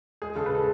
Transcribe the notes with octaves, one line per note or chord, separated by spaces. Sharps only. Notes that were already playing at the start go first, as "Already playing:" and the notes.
G#3 G#4
C#3 A4
B4
G#3 A4